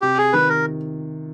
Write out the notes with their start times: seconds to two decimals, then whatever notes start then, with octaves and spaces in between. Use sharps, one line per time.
0.02 C3 G4
0.18 G#4
0.33 D#3 B4
0.49 A#4